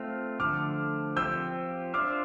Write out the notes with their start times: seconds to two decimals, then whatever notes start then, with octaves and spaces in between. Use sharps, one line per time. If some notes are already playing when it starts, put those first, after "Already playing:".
Already playing: A3 C4 F4 F6
0.40 D3 F3 A3 D6 F6
1.16 F3 C4 G4 E6 G6
1.94 D4 F4 C5 E5 D6 F6